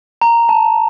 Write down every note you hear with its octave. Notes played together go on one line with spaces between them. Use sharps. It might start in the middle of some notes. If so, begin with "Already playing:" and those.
A#5
A5